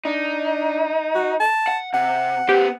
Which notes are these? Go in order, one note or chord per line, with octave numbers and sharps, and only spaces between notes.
D4 D#4
F#4
A5
F#5
C3 F#5
B3 G4 C5